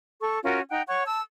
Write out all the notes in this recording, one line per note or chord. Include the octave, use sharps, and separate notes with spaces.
A4 C#6
C#4 F4 F#4 A#4
D#4 F#5 G5
C#5 F#5 C#6
A5 E6